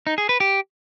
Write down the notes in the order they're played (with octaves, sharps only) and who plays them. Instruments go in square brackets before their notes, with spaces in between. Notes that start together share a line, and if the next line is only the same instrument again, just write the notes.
[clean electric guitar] D#4
G#4
B4
G4